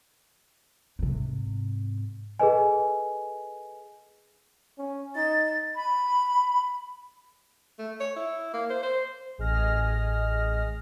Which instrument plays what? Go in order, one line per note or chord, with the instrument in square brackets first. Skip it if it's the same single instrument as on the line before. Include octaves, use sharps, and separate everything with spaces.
[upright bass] G#2 C3
[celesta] G#4 A4 B4 D#5 G#5
[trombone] C#4
[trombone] D#4 [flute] A6
[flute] B5
[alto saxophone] A3
C#5
E4
A#3
C5
C5
[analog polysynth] A1 G#4 D#5 F6 A#6